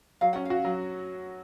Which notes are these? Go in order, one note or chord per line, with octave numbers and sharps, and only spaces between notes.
F#3 F5
C#4 F#5
F#4 F5
F#3